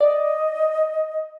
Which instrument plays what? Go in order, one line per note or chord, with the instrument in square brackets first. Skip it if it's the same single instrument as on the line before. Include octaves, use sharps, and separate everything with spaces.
[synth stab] D5 [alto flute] D#5